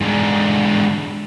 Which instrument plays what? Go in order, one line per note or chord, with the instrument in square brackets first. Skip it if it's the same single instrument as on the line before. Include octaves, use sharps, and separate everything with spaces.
[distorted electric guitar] G#2 D3